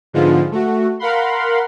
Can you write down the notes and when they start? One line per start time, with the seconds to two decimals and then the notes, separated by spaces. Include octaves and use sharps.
0.13 G#2 D3 F3 G#3 B3 F4
0.51 A3 F#4
0.99 A#4 F5 F#5 B5 C6